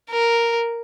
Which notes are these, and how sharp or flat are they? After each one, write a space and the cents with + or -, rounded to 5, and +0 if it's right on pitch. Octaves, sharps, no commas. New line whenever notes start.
A#4 +0